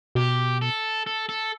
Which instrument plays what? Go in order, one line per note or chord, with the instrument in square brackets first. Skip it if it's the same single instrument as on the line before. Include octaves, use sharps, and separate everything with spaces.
[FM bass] B2 [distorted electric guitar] G4
[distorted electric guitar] A4
A4
A4